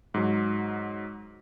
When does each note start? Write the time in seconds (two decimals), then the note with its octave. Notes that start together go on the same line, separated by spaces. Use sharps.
0.14 G#2 F#3